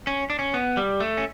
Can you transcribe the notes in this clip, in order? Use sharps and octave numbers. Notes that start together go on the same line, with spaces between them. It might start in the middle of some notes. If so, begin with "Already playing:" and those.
C#4
D4
C#4
B3
G3
A3
C#4